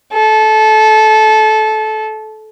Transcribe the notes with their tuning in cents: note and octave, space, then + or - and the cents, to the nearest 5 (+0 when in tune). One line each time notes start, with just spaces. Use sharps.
A4 -20